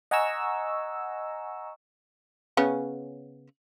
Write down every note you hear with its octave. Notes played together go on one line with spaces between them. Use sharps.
D#5 F#5 G#5 A#5 C#6 E6
C#3 B3 C#4